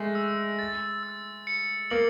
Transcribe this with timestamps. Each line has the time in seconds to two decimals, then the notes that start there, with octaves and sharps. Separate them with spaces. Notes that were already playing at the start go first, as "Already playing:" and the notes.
Already playing: G#3 A3
0.15 E6
0.59 A6
1.03 E6
1.47 C#7
1.90 A#3 F#7